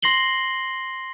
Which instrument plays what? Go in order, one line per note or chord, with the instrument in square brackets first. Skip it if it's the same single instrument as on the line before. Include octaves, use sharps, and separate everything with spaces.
[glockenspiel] C6 A#6 C7 F#7 G7